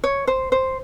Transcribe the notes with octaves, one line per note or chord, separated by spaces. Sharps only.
C#5
C5
C5